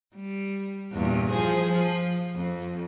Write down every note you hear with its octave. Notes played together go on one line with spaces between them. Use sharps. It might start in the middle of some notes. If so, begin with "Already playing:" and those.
G3
E2 G2 A#2
F3 G#4 C5
F3
F2